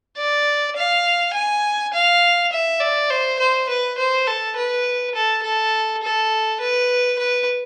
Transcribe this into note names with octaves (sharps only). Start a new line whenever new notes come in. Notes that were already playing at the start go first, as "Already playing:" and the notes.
D5
F5
G#5
F5
E5
D5
C5
C5
B4
C5
A4
B4
A4
A4
A4
B4
B4